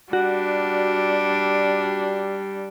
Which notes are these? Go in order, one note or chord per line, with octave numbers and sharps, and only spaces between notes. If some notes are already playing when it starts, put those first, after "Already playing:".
G3 D4 F#4